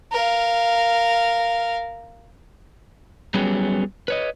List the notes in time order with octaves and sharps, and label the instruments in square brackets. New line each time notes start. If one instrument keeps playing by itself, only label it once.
[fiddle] A#4 F5
[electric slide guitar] F#3 G3 B3 C#4 G4 G#4
B4 C#5 D#5